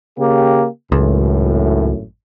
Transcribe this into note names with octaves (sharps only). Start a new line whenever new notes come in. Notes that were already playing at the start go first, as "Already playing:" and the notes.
C#3 A#3 G4
G#1 C#2 F#2 A2